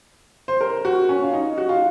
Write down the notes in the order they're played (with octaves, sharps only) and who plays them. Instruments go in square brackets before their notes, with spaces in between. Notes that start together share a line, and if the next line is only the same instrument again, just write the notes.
[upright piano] C5
A#4
F#4
C#4
F4
D#4
F#4
F4